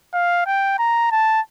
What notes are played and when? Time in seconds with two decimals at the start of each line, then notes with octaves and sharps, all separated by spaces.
0.13 F5
0.46 G5
0.78 A#5
1.11 A5